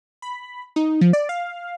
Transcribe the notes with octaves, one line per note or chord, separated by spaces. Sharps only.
B5
D#4
F3
D5
F5